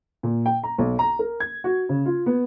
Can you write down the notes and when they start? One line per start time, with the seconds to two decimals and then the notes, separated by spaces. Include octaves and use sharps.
0.23 A#2
0.46 G5
0.64 A#5
0.78 B1
0.99 A#5
1.19 A#4
1.40 G#6
1.64 F#4
1.89 C#3
2.06 F4
2.26 B3